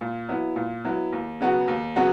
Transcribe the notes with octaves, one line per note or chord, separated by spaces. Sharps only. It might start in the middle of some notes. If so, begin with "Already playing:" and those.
A#2
F#3 B3 E4
A#2
F#3 B3 E4
D#2
C#3 F#3 B3 F#4
D#2
C#3 F#3 B3 F#4